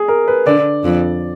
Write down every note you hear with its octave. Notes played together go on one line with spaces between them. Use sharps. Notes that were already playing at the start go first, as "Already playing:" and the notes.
Already playing: G#4
A#4
B4
D3 D5
F2